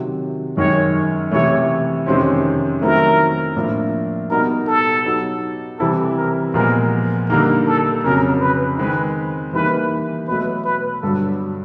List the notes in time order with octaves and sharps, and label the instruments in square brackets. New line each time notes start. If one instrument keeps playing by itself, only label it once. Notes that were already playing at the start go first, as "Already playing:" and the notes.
Already playing: [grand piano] C3 D#3 F#3
[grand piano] F#2 D#3 G#3 [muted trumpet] C#5
[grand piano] C3 E3 A3 [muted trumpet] C#5
[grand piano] F2 C3 D#3 G#3 C#4 [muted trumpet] C5
[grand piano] D#3 F#3 A3 C4 E4 [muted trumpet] A#4
[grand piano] A2 F3 A#3 D4 F4
[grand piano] B2 G3 B3 D#4 [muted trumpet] A#4
[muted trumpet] A4
[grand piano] F#3 B3 D#4 G4
[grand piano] C3 E3 G3 C4 E4 [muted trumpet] A4
[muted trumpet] A#4
[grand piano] A#2 F3 G#3 B3 [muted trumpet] A#4
[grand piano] D3 G3 A#3 D#4 [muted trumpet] A#4
[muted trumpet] A4
[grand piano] F2 C#3 F#3 [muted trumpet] A#4
[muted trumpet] B4
[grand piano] D#3 G#3 C4 D#4 [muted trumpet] B4
[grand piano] E3 G3 A#3 D#4 [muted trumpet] B4
[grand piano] B2 F#3 A3 [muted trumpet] B4
[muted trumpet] B4
[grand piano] G2 D3 F#3 [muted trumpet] A4